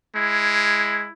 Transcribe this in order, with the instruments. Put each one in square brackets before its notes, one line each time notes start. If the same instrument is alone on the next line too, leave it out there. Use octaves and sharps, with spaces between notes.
[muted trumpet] G#3 [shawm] E4